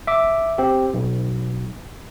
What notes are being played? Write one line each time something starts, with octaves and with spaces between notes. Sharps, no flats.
E5 D6
C4 G4
B1